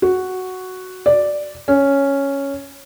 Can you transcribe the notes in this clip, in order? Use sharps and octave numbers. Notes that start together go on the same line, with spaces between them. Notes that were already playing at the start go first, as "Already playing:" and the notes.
F#4
D5
C#4